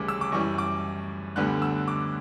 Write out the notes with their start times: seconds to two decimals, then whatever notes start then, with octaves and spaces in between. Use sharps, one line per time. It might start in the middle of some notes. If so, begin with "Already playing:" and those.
Already playing: D2 C#3 E3 G3 C#4 D6
0.08 E6
0.21 D6
0.32 F#2 E3 G3 C#6
0.58 D6
1.36 D2 D3 G3 B3 F#6
1.62 E6
1.88 D6